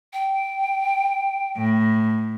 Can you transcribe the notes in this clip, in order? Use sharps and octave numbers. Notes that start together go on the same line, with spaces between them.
G5
A2